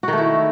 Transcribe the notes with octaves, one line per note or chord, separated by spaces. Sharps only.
D#3 A3 E4 F#4